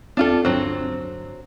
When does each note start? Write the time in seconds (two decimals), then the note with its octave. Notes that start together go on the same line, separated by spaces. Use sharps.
0.17 E2 C4 D4 F4 A4
0.45 D1 G2 F#3 C4 D4